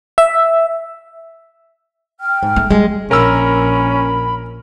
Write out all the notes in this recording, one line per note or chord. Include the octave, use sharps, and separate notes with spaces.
E5
G5 F6
G#2
A3
G3 G#3
A#1 C#4 A#4 B5 E6